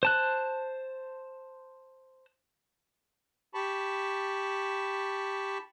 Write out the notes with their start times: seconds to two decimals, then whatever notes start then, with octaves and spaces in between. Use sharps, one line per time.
0.03 C5 A5 F#6
3.54 G4 A5 B5 C#6